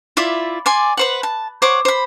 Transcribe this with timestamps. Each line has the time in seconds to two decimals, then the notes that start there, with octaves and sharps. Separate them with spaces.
0.17 E4 F4 D5 E5
0.66 D5 G#5 C6
0.97 B4 C5 F#5
1.23 A5
1.62 C5 C#5 F#5 D6
1.85 C5 B5